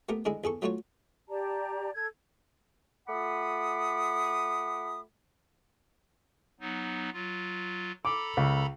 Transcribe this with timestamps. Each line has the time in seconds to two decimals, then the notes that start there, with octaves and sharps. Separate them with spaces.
0.09 A3 B3 G4 A#4
0.25 D3 G#3 E4 G#4
0.44 E2 G#4 A4 C#6
0.62 F#3 A3 F4 F#4 C#5
1.28 G4 D5 A5 A#5
1.94 A4 G#6
3.08 A3 F4 F#5 B5 D6 D#6
6.60 F#3 B3 D#4
7.13 F#3 F4
8.05 A4 A#5 B5 D6
8.37 C#2